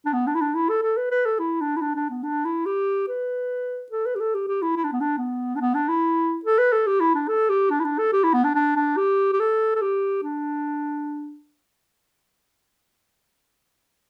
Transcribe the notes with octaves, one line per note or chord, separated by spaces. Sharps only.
D4
B3
D4
E4
D4
E4
A4
A4
B4
B4
A4
E4
D4
E4
D4
D4
B3
D4
E4
G4
B4
A4
B4
G4
A4
G4
G4
E4
E4
D4
B3
D4
B3
D4
B3
D4
E4
A4
B4
A4
G4
E4
D4
A4
G4
D4
E4
D4
A4
G4
E4
B3
D4
D4
D4
G4
G4
A4
A4
G4
D4